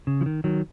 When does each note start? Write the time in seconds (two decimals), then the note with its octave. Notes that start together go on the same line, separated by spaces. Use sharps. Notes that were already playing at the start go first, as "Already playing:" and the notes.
0.07 C#3
0.21 F3
0.26 D#3
0.44 D#3 F#3